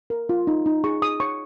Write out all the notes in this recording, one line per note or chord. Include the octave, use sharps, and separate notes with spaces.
A#4
F4
D#4
D#4
G#4 C#6
G#4 D#6
C#5 C#6